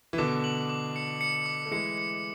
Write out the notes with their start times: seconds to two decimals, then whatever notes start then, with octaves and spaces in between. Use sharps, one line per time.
0.13 E3
0.18 B2 D3 D6
0.44 F#7
0.69 D6
0.96 C#7
1.21 C#7
1.46 D6
1.66 A3
1.72 E3 G#3 C#7
1.97 C#7